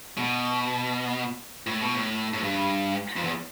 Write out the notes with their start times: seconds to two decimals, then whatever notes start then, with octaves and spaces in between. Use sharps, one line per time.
0.18 B2
1.67 A2
1.81 B2
1.95 A2
2.34 A2
2.43 G2
3.16 F2
3.24 E2